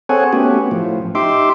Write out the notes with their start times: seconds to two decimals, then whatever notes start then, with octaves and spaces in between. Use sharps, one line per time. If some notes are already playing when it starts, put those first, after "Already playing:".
0.09 C4 G#4 A4 C#5 F#5 G#5
0.33 A3 B3 C#4 F#4 G4
0.71 A2 F3
1.15 D#4 G4 E5 C6 D6